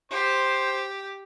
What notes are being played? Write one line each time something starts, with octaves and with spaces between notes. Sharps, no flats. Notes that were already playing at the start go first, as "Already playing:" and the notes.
G4 C5